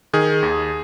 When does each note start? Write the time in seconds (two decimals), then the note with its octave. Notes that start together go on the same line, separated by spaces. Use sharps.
0.13 D#3 G#4
0.43 D#2